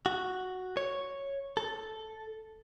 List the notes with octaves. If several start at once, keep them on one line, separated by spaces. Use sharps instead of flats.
F#4
C#5
A4